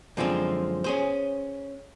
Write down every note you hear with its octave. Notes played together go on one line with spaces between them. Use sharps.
F#2 D3 F3 G#3 C4
C#4 G#4 C5